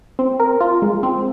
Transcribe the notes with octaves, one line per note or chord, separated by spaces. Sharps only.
C4
A#4
F4
G#3
C4